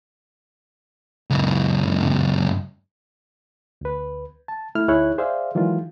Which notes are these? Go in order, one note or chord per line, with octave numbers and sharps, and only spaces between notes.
C#2 F#2
D2 B4
A5
A3 E4 F6
D2 D#4 E4 G#4 C#5 F#6
G#4 C5 D5 E5 F5
D#3 E3 F#3 G#3 F4